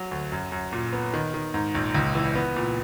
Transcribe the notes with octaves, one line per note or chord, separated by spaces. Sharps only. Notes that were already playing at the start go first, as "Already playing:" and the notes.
Already playing: F#3
D2
F#2
F#2
A#2
B3
D#3
D#3
G#2
A#1
C#2
E3
B3
A#2